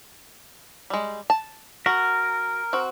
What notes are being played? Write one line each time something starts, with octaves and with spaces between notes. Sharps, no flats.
G3 G#3
A5
F#4 A#4
C4 F#4